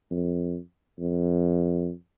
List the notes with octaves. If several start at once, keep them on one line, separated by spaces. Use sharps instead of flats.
F2
F2